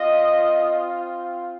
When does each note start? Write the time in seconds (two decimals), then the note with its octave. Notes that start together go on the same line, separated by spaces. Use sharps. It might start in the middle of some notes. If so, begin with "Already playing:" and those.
Already playing: C4 F4 D#5